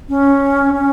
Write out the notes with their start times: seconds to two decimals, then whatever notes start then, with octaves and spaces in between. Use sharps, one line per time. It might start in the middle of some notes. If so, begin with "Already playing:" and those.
0.09 C#4
0.74 C#4